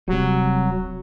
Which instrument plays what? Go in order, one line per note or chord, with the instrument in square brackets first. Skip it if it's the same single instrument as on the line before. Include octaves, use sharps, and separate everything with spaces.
[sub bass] D1 [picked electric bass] C3 G3 [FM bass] F#3